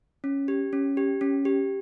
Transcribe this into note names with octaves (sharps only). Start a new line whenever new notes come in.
C#4
G4
C#4
G4
C#4
G4